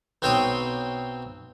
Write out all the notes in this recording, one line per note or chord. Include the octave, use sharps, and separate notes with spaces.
B1 C4 C5 C#5 G5 D#6